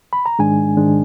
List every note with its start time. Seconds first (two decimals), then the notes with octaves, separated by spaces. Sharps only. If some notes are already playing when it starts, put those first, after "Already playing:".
0.13 B5
0.26 A#5
0.39 G#2 D#3 G#3 D4 G#5
0.77 G#2 D#3 G#3 D4